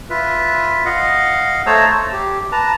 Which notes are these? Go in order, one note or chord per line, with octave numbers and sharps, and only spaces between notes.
F4 B4 E5
D#5 F5 F#5
A3 C5 C#5 A5 A#5 E6
E6
G4
B4 A5 A#5